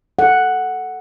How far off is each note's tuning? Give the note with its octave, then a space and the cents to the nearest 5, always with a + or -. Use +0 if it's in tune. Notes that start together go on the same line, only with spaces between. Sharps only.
A4 +0 F#5 +0